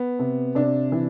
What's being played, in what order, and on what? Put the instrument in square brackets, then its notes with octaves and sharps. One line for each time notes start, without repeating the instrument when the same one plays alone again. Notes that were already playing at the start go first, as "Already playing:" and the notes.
Already playing: [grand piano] B3
[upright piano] C3
[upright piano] C3 [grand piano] D4
[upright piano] E3